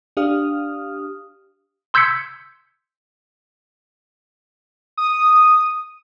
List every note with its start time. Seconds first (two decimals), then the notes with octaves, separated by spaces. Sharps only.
0.17 D4 G4 F5 D#6 F6
1.94 C6 E6 G6 G#6 B6 C#7
4.97 D#6